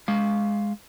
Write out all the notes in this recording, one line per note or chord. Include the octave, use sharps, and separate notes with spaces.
G#3 F5